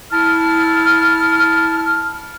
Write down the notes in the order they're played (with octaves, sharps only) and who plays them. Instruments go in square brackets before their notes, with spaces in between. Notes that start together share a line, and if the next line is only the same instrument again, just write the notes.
[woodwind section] E4 A5 F6